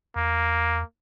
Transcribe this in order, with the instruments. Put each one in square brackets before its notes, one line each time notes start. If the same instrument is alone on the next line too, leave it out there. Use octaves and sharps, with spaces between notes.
[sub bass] E2 [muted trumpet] A#3